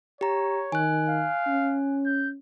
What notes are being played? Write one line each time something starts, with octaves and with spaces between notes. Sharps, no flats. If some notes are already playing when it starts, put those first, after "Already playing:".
G4 C#5 A#5
D#3 G#5 F#6
F5
C#4
G6